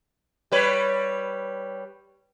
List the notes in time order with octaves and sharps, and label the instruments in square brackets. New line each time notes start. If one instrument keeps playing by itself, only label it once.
[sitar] G3 B4 C#5